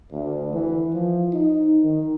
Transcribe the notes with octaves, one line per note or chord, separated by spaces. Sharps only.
D2
E3
F3
D#4
D#3